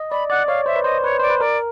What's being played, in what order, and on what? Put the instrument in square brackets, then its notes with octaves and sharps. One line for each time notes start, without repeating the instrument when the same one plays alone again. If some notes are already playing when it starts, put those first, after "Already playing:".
Already playing: [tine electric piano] D#5
[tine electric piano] D5 [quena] B5
[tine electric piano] D5 [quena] F#5
[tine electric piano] C#5 [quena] F5
[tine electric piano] C5 [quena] E5
[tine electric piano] B4
[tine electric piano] C5 [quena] D#5
[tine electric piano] B4 [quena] C#5
[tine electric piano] C5 [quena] D5
[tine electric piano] B4
[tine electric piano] A#4 [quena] D5